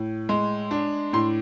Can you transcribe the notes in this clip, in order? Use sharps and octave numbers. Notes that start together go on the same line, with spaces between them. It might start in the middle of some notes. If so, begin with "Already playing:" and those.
Already playing: A2
G#3
D4
A2 C6